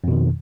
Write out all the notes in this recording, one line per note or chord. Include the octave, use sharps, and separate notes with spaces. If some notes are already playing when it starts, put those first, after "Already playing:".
F2 B2 D#3